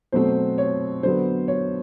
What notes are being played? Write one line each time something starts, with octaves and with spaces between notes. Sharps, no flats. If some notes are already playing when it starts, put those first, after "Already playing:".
B2 F#3 A3 C4 C5
C#5
D3 F#3 B3 C5
C#5